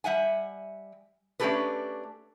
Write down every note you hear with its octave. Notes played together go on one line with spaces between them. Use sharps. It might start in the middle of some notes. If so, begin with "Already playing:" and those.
G3 E5 F#5 G#5
A3 C#4 D4 G4 A4 B4